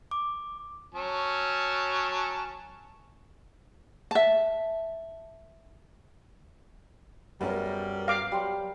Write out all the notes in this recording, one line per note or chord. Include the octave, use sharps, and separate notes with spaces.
D6
F#3 C#4 A5
E5 A5
F#2 G3 B3 G#4 A#4 C#5
F5 D6
F#3 G3 G5 C6